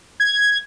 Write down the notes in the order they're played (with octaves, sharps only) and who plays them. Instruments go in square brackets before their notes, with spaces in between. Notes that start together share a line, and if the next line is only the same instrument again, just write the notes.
[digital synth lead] G#6